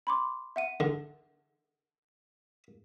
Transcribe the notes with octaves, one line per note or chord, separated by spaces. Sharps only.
B5 C6 D6
E5 F#5 D#7
D3